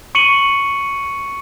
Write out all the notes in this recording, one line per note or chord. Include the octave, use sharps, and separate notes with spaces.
C#6 C#7 D#7 F#7